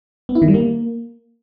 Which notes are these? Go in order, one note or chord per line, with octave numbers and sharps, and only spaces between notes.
B3
E4
D#3
G3
A#3